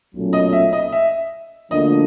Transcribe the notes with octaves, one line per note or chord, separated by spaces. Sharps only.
B1 A#2 F#3 A3 C#4
D#5
E5
D#5
E5
D2 D3 F3 A#3 D4 D#5